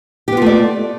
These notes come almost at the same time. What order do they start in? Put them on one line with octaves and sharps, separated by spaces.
G4 B3 F4 A3 D5